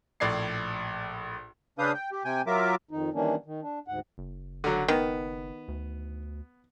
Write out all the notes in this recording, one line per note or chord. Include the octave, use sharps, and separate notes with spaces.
A#1 A2 D5 G#6 C7
C#3 D4 B4 F5 D#6 G6
G5
G4
C3 G5 G#5
F#3 F4 A#4 E5 D6
F2 D#3 D#4
D#3 E3 G3 A#3 C#4 D4
D#3
D4
D2 G#2 F#5
F#1
D3 F#3
D#3 B3
D2